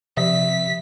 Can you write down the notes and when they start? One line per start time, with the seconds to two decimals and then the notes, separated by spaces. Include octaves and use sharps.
0.17 C3 F3 E5 B6